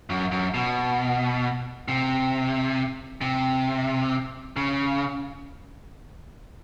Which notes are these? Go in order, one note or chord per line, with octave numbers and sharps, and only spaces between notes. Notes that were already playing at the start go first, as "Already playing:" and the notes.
F#2
F#2
B2
C3
C3
C#3